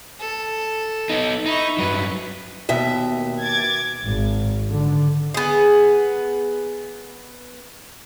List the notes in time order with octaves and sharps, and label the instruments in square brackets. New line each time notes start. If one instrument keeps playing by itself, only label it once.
[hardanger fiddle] A4
[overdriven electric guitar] B3 D#4
[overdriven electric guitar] D#4 [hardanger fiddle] E4 C#6
[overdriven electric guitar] G2 F#3 [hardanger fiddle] B4
[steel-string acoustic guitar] D#2 B2 E5
[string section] D6 G#6 A6
[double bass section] G#1
D3
[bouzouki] B3 G#4